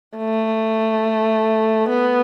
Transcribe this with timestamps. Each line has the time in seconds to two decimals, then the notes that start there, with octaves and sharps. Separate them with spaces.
0.17 A3
1.89 B3